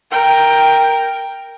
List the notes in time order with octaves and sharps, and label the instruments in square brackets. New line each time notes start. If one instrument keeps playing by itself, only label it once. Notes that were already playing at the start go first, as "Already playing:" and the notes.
[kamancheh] A#4 G5